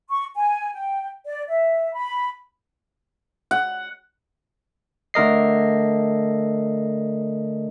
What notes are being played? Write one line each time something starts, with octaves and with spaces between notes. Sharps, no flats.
C#6
G#5
G5
D5
E5
B5
F#5
D3 A3 A#4 D#5 C7